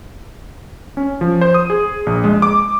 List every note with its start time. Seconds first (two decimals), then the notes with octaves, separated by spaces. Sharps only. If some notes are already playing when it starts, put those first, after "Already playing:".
0.97 C#4
1.21 F3
1.41 C5
1.54 D#6
1.70 G#4
2.06 A#1
2.24 G#3
2.42 D6